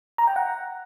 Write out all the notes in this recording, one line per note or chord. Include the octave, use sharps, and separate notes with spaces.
A#5
G5
F#5